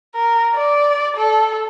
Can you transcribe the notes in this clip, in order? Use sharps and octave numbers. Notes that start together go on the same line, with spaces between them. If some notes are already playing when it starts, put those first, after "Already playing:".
A#4
D5
A4